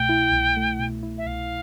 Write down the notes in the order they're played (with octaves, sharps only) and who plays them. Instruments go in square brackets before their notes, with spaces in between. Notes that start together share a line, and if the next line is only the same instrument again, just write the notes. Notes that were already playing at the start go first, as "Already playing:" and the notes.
Already playing: [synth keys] C2 B2 A3 [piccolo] G5
[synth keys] E4
C2
A3
B2
E4
[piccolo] E5
[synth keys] C2 [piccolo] F5